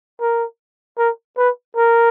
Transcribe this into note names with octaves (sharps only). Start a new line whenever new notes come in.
A#4
A#4
B4
A#4